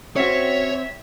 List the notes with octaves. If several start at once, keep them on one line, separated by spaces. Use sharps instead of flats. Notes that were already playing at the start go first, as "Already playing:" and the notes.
C4 C#4 F#4 C#5 E5